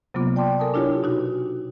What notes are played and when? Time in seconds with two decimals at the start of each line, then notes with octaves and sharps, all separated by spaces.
0.14 C3 F#3 A#3 B3 F4 D6
0.36 D5 G5 A5 C6 D6
0.59 A4 A#4 G#5 A5 D#6
0.74 D4 E4 F4 G4 C#5
1.03 B2 D#4 F#4